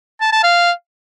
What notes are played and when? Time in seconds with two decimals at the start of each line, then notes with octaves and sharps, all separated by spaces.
0.21 A5
0.32 A5
0.43 F5